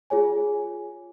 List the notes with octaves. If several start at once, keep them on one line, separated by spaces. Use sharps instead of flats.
F4 G#4 C#5 G#5